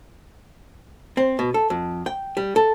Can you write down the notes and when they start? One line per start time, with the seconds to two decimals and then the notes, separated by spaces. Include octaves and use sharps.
1.17 C4
1.39 B2
1.54 A4
1.70 F2
2.06 G5
2.37 G3
2.56 A4